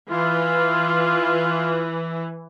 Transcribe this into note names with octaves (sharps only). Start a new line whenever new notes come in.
E3 F4